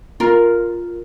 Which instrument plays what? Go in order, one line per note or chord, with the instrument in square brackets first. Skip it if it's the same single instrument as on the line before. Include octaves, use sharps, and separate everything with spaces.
[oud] F4 A#4